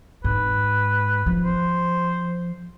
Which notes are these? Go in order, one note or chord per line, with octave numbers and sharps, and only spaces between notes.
G#2 B4
F3
C5